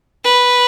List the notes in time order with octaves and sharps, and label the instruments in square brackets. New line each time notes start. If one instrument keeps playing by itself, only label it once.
[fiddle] B4